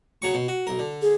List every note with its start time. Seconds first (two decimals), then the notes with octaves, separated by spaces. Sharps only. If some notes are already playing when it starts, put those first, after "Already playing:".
0.22 C#3 F#3 C#6
0.34 B2
0.48 F#4
0.67 B1 A#4
0.79 D3
1.02 G#4